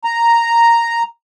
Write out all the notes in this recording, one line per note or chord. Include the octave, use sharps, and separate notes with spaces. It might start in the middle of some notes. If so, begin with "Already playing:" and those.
A#5